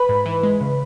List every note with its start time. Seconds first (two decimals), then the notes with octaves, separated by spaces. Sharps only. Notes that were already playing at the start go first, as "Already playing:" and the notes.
Already playing: B4 B5
0.09 G#2
0.26 E3
0.43 G#3
0.61 C#3